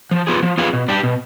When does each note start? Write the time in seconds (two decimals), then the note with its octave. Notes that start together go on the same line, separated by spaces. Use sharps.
0.11 F3
0.27 B3 F4 G#4
0.42 F3
0.58 B3 F4 G#4
0.73 B2
0.88 G3 D4 G4
1.03 B2